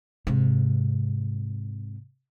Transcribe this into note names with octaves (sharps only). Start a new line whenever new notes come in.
G#2 C3